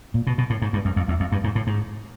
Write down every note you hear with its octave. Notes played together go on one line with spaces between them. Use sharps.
A#2
B2
B2
A2
G#2
G2
F#2
F2
E2
F2
G2
G#2
A2
G#2